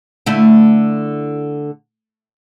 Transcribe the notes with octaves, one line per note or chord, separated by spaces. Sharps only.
D3 A3 E4